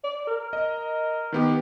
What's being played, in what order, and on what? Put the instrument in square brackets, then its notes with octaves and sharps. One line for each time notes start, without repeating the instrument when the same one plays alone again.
[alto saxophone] D5
A#4
[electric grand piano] D#5
D#3 B3 G4